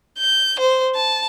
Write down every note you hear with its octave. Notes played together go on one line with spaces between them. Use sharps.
G6
C5
A5